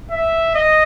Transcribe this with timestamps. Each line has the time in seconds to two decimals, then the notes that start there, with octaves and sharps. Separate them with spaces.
0.11 E5
0.55 D#5